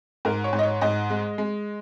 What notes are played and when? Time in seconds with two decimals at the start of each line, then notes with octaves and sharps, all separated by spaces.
0.25 G#2 A#4
0.44 C#5
0.53 G#2
0.59 D#5
0.63 C#5
0.81 G#2 D#5
1.10 G#3
1.38 G#3